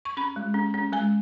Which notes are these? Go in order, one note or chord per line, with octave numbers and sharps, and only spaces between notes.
C#6
C#4 B5
G#3
C#4
C#4
G#3 G#5